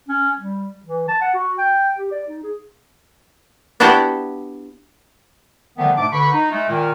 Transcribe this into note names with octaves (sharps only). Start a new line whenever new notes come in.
C#4
G3
E3
A5
F#5
F#4
G5
G4
D5
D#4
G#4
B3 D4 E4 F#4 G4
D3 D#3 F3 G3 A3 B3
G#2 B2 A3 D4 A5 D6
D3 B4 B5 C#6
D#4
G#3 A3
A#2 D#3